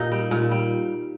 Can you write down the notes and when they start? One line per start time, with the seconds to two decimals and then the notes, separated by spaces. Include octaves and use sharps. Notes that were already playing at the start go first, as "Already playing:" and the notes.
Already playing: A#2 D#4 G4
0.12 G3
0.31 A#2
0.51 G3